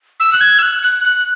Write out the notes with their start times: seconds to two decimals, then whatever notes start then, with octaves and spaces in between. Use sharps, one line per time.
0.20 E6
0.33 F#6
0.41 G#6
0.59 E6
0.63 F#6
0.83 F#6
1.05 F#6